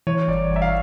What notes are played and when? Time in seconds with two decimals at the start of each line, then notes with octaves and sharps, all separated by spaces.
0.07 E3 C#5
0.28 G1 D5
0.51 G1 E5
0.62 F5